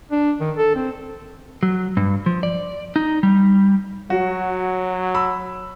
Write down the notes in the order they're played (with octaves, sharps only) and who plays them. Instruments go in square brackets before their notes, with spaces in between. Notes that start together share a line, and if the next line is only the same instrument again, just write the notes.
[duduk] D4
D#3
A4
C4
[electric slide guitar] F#3
G2
F3
D5
D#4
G3
[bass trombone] F#3 [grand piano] F#4
[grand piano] B5 E6